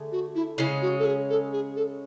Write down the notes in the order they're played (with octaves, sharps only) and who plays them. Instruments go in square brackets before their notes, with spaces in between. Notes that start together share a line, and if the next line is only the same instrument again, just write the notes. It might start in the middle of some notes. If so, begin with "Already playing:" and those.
Already playing: [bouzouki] D3 A3 G#4
[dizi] F#4
E4
[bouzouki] C#3 G#3 C#4 [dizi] E4
[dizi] F#4
A4
G#4
A4
G#4
A4